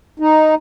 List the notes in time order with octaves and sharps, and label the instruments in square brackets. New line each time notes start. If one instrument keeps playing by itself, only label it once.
[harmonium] D#4